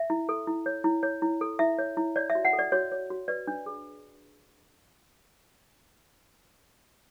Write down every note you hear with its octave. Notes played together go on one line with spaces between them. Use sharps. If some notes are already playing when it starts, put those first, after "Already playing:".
Already playing: E5
E4
A4
E4
C#5
E4
C#5
E4
A4
E4 E5
C#5
E4
C#5 D5
E5
F#4
F#5
A4
D5
F#4 C#5
C#5
F#4
B4 D5
D4
G#4